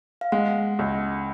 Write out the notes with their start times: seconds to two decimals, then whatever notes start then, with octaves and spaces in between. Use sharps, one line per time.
0.21 F5
0.32 G#3 F#5
0.79 C#2